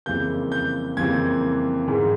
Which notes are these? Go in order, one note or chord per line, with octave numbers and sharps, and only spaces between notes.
F2 C#3 E3 G3 A#3 G6
G6
F2 C#3 E3 G3 A#3 G#6
G#2 E3 G#3